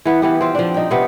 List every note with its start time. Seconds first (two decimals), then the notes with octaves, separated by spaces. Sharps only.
0.05 E3 B3
0.22 E3 B3 G4
0.41 C4 F4
0.55 F3 D4
0.74 D#4 G5
0.91 C3 B3